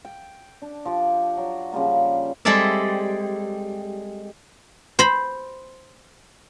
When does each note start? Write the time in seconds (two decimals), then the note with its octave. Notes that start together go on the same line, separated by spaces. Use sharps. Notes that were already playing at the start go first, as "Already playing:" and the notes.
0.05 G5
0.62 D4
0.85 F3 G4 D5
1.37 F#3
1.72 C#3 F3 G3 A#3
2.45 G3 G#3 C4 A4 D5 E5
4.99 C5 B5